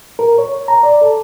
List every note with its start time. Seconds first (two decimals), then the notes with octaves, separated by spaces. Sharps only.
0.19 A#4
0.38 C#5
0.68 A#5
0.83 D5
1.01 A4